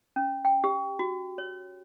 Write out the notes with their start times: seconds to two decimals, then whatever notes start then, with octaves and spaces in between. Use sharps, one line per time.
0.16 C#4
0.45 G5
0.64 G4
0.99 F#4
1.38 C#5